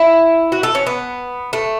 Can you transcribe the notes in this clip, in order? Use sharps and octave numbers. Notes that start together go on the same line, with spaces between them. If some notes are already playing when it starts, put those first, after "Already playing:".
Already playing: E4
F#4
A4
C#4
B3
A3